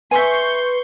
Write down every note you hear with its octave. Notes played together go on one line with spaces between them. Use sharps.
B4 E5 G#5 C6 C#6 G6